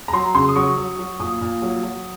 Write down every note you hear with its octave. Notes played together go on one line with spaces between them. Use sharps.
A#5
F#3 C6
C#3 C6
D#6
F#3 C#6
F#3
F#3
A#2 D#6
A#2
F#3
F#3